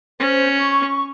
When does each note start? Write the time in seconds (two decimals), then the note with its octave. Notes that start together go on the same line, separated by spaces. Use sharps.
0.20 C#4 C5
0.60 C#6